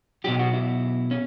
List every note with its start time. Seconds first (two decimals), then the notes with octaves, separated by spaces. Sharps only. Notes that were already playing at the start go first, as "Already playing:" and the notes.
0.24 B2 F#3 G4
0.39 F#4
0.53 E4
1.11 C#4